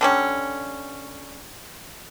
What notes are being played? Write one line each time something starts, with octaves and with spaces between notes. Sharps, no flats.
D3 G3 C#4